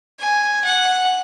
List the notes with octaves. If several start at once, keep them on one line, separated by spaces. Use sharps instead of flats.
G#5
F#5